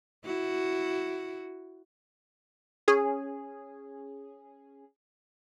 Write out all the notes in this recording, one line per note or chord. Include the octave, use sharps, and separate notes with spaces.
E4 F#4
C#4 G#4